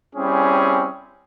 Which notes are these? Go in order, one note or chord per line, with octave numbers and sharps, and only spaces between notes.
G3 C4 C#4 E4 G#4